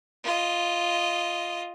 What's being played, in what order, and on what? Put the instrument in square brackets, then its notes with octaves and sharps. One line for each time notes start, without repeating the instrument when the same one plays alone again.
[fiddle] F4 D#5